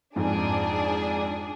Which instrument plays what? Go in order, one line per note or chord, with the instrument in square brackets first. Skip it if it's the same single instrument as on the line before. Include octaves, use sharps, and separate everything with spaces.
[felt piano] F2 G#2 [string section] D4 G#4